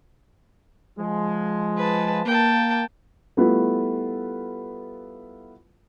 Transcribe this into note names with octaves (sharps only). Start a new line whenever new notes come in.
F3 G#3
B4 A5
A#3 G5 A5
G3 A3 B3 E4 F4 B4